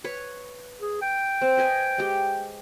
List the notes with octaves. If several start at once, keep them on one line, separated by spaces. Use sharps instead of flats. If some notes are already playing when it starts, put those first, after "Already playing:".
B4 C#5
G#4
G5
C4
B4 D#5 G#5
G#3 G4